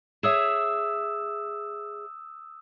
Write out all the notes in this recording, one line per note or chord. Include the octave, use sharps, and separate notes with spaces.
G#4 C#5 E5 D#6 E6 E7